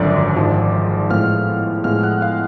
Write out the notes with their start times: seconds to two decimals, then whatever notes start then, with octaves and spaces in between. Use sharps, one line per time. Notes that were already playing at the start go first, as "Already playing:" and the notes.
Already playing: G#1 F#2 D3 F3 D5 D6
0.36 G#1 G#2 F3
1.10 A2 F3 G#3 B3 F5 F6
1.84 A2 F3 G#3 B3 F5 F6
2.03 F#5 F#6
2.21 F5 F6